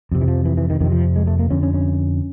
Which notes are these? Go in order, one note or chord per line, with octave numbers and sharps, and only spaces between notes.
F2 C3
E3
F3
E3
E3
D#3
F2 C3 D#3
F3
G#3
A3
A#3
F2 D3 C#4
C#4
C#4